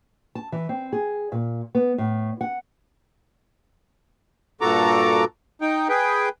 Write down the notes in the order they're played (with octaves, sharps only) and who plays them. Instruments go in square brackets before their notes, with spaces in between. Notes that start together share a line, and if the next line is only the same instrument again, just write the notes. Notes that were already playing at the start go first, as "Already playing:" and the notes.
[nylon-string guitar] A5
E3
C4
G#4
A#2
B3
A2
F#5
[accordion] G2 A#2 F#4 A4 A#5 D6
D#4 G5
G#4 B4 G5